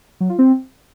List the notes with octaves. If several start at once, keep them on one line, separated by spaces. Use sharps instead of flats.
F#3
F4
C4